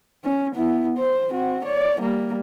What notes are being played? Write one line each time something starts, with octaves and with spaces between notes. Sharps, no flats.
C#4
B3 E4
C5
C4 F#4
C#5 D5
G3 A#3